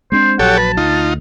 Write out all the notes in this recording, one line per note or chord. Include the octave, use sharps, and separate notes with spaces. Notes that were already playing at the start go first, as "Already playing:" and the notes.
G#3 C4 D4 C5
A#1 F#3 G4 A4 C#5 F#5
B4 A5
D2 D#4 F4